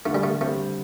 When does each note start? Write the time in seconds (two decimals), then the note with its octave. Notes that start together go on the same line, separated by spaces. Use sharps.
0.06 D3 A3
0.15 G3
0.23 A3
0.40 G3 A3 C4